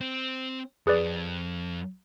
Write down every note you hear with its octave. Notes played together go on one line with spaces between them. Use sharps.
C4
F2 G#4 B4 D5